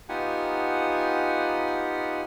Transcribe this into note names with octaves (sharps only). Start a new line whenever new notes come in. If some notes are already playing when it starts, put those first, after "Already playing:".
B3 D#4 F4 G4 F#5 G#5